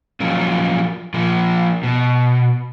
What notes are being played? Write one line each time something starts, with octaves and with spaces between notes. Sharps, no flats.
F3 F#3 A#3 C#4
F3 A#3
B2